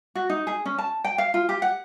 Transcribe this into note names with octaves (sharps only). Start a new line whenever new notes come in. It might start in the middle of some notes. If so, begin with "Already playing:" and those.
F#4
D#4
G#4
C#4
A5
G5
F5
F4
G4
F#5